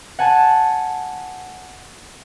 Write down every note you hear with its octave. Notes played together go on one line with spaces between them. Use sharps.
F#5 G#5 A5